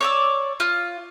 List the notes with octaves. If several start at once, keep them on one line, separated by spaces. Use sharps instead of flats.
C#5 D5 E6
F4